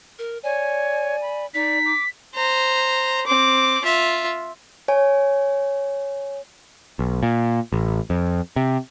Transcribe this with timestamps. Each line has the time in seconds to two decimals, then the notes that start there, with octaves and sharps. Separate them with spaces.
0.19 A#4
0.44 C#5 D5 G#5
1.21 B5
1.54 D#4 D5 B6
1.85 D6
2.35 C5 A#5
3.27 C4 D6
3.84 F4 E5
4.88 C#5 G#5
6.99 B1
7.23 A#2
7.72 A1
8.10 F2
8.56 C3